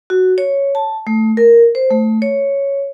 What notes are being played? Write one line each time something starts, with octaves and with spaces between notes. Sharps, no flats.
F#4
C#5
A5
A3
A#4
C5
A3
C#5